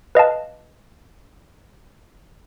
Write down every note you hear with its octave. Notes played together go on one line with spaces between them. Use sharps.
B4 D#5 F5 A5